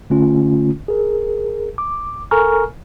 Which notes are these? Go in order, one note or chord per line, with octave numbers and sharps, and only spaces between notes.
D3 A3 C#4 F4
G#4 A#4
D6
A4 A#4 G#5 A#5 C#6 F6